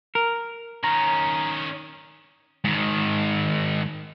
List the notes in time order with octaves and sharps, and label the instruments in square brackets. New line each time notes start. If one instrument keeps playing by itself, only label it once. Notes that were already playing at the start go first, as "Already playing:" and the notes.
[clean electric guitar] A#4
[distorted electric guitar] D#3 C#4 [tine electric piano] A#5 A#6
[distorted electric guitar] G#2 D#3